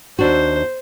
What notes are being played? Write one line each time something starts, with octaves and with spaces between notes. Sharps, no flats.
D#2 D4 F#4 C5